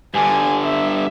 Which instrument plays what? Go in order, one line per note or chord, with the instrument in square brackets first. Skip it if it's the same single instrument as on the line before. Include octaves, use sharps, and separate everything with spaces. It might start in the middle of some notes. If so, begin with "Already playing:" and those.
[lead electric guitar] G2 D3 [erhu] G#5
[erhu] E5